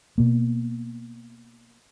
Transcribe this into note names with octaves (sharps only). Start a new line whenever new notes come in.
B2 A#3